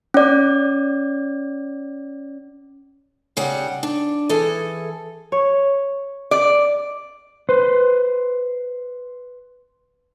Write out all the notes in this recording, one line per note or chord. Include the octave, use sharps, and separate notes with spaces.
C#4 D5
C#3 G3 F#5
D4
E3 G#4 A4
C#5
D5
B4 C5